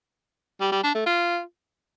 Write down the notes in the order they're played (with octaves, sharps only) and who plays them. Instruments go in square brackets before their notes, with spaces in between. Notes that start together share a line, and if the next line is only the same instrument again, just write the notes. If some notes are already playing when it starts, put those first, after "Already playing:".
[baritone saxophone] G3
G3
D4
A3
F4